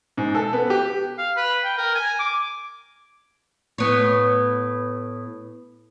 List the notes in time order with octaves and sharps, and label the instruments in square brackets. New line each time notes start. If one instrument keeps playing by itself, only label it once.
[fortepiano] G#2
A4
B3
G4
[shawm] F5
B4
G5
A#4
G#5
D6
[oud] A2 B3 C#5